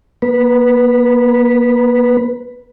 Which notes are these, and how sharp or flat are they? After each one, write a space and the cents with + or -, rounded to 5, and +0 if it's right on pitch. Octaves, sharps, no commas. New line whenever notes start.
A#3 +35 B4 +0